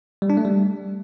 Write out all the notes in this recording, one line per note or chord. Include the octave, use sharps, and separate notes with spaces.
G3
D4
A3
G3